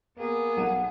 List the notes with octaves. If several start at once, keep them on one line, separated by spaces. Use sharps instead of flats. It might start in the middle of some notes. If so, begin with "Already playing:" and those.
A#3 B3 G#4
B1 F#5 D#7